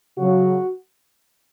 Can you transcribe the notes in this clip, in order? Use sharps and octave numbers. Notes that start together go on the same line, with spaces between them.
C#3 F#3 F#4